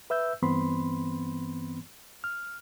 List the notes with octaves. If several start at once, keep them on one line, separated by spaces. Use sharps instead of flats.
B4 E5 E6 G6
G2 E3 B3 C4 B5 C6
F6